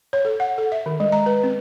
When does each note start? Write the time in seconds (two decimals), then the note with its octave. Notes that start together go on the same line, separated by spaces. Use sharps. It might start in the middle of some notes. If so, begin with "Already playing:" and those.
0.13 C#5
0.25 A4
0.40 F#5
0.58 A4
0.72 E5
0.86 D#3
1.00 G#3
1.12 A#5
1.26 B4
1.43 C4